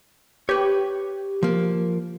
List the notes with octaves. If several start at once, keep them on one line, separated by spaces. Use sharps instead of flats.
G4 B4 C#5
F3 A#3